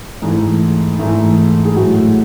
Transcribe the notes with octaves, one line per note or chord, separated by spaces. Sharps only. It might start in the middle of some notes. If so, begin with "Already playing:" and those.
G#2 E3 A3
G#2 E3 A3 E4
G#4
A2 F#3 A3 F#4